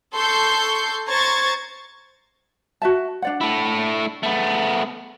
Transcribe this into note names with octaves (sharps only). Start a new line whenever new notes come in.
A4 C6 C#6 G6
C5 A#5 C#6 G#6 A6
F#4 E5 A5
D4 D5 F#5
A3 E4
A3 B3